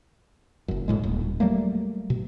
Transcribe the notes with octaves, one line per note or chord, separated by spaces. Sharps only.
F#1 F#2
G#1 E2 A2 G#3
D#1
F#3 G3 A3 A#3
B2